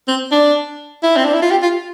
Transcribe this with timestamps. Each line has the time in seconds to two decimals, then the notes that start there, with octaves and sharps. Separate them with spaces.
0.08 C4
0.32 D4
1.03 E4
1.17 C4
1.25 D4
1.34 E4
1.42 F4
1.51 G4
1.63 F4